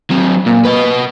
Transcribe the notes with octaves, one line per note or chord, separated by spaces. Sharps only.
F#3 C4
A#2
B4 D#5